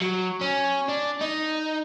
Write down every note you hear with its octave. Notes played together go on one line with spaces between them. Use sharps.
F#3
C#4
D4
D#4